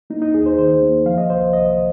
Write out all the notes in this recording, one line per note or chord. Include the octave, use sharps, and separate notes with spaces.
A#3 D#4
D#4
D#2 G#4
C5
D#3 C5
A#3
F3 F5
D#5
C2 C5
C2 D#5